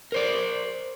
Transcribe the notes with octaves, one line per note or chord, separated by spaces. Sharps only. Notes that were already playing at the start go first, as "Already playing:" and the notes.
A#4 C5 D5